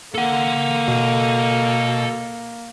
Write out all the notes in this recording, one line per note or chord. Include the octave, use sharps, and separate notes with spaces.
A#3 A4 F#5
B2